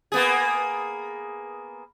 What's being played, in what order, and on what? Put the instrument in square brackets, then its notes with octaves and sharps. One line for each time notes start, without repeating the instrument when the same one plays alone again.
[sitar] A#3 B3 G#4